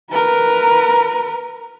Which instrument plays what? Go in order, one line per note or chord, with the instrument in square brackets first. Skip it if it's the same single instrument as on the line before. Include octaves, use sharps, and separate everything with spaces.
[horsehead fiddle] A#4 B4